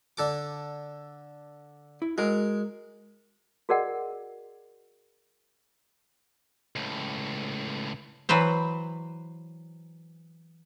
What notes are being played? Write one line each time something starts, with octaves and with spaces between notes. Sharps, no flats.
D3 A4 D6
E4
G#3 F#4 G#4 A#4
F#4 G#4 A#4 D5 D#5 F#5
C#2 A2
E3 F#3 B4 C5